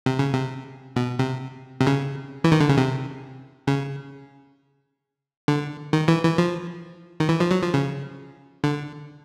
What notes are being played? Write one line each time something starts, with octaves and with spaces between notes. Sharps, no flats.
C3
C#3
C3
B2
C3
C3
C#3
E3
D#3
D3
C#3
C3
C#3
D3
D#3
E3
E3
F3
D#3
E3
F3
F#3
F3
C#3
D3